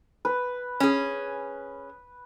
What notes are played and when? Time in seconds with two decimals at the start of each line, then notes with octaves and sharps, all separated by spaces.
0.25 B4
0.80 C#4 G#4